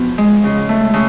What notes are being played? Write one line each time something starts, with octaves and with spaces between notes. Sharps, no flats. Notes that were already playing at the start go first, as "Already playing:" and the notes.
Already playing: F3 B3 F#4
G#3
C#3
A3
C#3